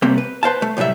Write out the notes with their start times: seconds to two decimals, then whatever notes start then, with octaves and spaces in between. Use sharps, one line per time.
0.02 C3 G3 A3 A#3 C4
0.18 B4
0.43 B4 C5 F5 A5
0.62 A3
0.77 C2 A2 F#3 G3 E5